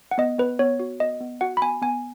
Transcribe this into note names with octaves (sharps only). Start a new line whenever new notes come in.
F#5
B3 D#5
B3 B4
B3 C#5
F#4
B3 D#5
B3
F#4 F#5
B5
B3 G#5
B3 G#5